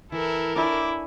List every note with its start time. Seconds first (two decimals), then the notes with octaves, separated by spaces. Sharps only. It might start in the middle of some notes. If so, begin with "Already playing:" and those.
0.12 E3 E4 A4 A#4
0.56 D4 E4 C#5 G#5 D6